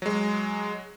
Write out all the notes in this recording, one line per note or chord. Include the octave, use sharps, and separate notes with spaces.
F#3 G#3